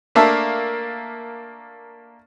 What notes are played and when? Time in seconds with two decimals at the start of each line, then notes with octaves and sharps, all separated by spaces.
0.15 A3 A#3 D4 E5 A5